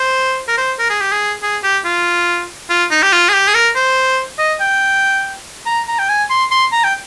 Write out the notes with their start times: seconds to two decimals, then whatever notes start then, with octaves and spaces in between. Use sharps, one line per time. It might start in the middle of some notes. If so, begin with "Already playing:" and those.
Already playing: C5
0.48 A#4
0.57 C5
0.79 A#4
0.89 G#4
1.01 G4
1.12 G#4
1.42 G#4
1.63 G4
1.85 F4
2.70 F4
2.91 D#4
3.02 G4
3.12 F4
3.28 G#4
3.33 G4
3.48 G#4
3.54 A#4
3.75 C5
4.39 D#5
4.60 G5
5.66 A#5
5.88 A#5
5.99 G5
6.09 G#5
6.30 C6
6.51 C6
6.72 A#5
6.84 G5